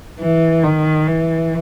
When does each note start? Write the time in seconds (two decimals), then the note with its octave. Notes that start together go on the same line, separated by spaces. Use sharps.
0.20 E3
0.64 D#3
1.08 E3